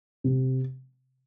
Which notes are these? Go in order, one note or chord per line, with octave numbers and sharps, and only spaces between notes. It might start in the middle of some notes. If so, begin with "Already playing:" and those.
C3